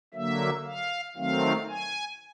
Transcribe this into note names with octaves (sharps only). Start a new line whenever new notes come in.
D3 F#3 A#3 E5
F5
D#3 F#3 A3 C4 F5
G#5